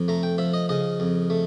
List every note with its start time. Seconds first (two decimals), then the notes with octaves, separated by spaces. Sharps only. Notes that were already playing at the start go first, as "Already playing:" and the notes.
Already playing: F2
0.08 A3 A#5
0.23 G5
0.38 F3 E5
0.54 D#5
0.69 C#3 D#5
1.00 F2
1.30 A3